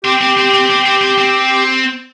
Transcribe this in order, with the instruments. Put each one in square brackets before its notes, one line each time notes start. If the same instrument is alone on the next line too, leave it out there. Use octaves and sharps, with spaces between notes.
[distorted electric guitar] C4 [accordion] G4
[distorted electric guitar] C4
C4
C4
C4
C4
C4
C4